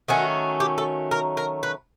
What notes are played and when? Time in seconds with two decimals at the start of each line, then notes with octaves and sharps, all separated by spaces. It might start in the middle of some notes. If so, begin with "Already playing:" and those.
0.08 D#3 F#3 A3 C#4 F#4
0.60 G4
0.78 A4
1.11 A#4
1.37 A#4
1.63 B4